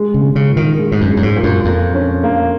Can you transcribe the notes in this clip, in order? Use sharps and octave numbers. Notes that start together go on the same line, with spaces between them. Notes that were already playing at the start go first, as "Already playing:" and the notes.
Already playing: G#3
C#3
G#3
C#3
A#2
D#3
G#3
G#2
F#2
G#3
F#2
G#2
A#2
F#2
F2 A#3
C#4
A#3